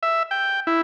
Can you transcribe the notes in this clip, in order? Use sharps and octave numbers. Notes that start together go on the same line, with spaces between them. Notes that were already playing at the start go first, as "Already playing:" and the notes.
E5
G5
E4